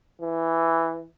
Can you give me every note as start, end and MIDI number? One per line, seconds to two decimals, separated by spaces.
0.22 1.06 52